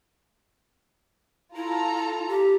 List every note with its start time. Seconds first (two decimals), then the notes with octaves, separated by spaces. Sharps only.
1.56 E4 F4 A4 A#5
2.28 G4